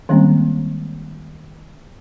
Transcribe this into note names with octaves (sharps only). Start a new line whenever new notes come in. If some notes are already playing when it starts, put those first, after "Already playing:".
D#3 G3 G#3 A#3 C4 C#4